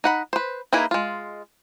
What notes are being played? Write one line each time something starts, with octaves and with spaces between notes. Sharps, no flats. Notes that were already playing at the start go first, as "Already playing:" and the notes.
D#4 F#5 B5
B4 C5
A#3 D#4 E4 G#4 B4
G#3 F4